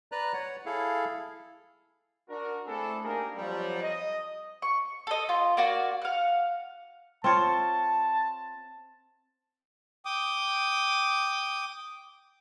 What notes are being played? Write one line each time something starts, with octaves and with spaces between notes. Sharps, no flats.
B4 D5 A#5 F#6
C#5 F#5
E4 G#4 A4 F5
D4 F#4 A#4
A3 C4 D4 E4 G#4 A4
A#3 D4 D#4 G4 G#4 A#4
F2 F#3 G3
D#5
C#6
A4 D#5
F4
A#3 F#4 D5
F5 F#5
C4 F4 C#5 A5
G5 D6 D#6